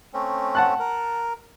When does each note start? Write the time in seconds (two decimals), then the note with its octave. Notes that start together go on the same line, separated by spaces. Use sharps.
0.13 A3 C4 C#4
0.55 F#5 A5 F#6
0.79 A#4